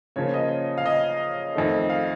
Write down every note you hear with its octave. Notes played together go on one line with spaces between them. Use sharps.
C#3 F3 A#3 C#5
D#5
F5
D#5
F2 D#3 A3
F5